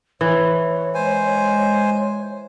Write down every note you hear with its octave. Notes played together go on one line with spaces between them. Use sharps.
E3 C#5
G#3 C5 G#5